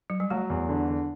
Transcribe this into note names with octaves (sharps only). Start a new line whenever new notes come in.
F#3
G3
F#3 A3
E2
D3
D3